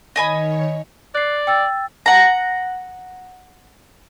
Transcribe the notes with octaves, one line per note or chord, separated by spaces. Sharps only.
D#3 C#5 D#5 G#5 B5
D5 F#6 C7
G5 E6 A6
F#5 A#5